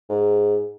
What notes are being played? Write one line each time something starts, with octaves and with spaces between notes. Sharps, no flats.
G#2